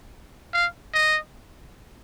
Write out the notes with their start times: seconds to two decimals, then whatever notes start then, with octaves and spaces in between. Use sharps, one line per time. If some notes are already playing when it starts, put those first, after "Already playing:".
0.54 F5
0.94 D#5